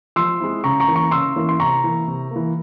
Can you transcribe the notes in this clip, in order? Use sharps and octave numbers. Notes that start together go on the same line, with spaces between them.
F3 C6 E6
G#3 C4 E4
C#3 A#5 C#6
A#5 C#6
E3 A#3 C#4 E4
A#5 C#6
C#3 C6 E6
E3 A#3 C#4 E4
C6
C3 A#5 C#6
E3 A#3
C3
E3 A#3